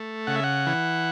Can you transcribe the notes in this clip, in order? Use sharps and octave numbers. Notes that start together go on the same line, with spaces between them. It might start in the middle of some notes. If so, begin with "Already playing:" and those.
Already playing: A3
C#3 F#5
E5
F#5
E3